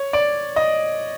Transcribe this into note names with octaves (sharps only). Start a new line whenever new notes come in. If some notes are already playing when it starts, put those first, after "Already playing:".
Already playing: C#5
D5
D#5